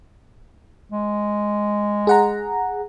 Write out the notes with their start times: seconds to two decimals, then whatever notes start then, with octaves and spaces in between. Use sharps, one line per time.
0.92 G#3
2.07 G#4 F#5 A#5